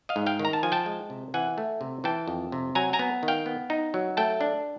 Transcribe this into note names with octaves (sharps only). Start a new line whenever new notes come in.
D#5 F5
G#2
F5 G5
D#3
A#5
A5
F3 G#5
G5 A5
G#3
C3
E3 F#5 G#5
A3
C3
E3 G5 A5
F2
C3
F#3 G#5 A#5
G#5 A#5
B3
D#3
F5 G5
B3
D#4
F#3
A3 G5 A5
D4